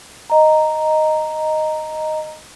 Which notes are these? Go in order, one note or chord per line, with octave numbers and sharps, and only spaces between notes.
D#5 A#5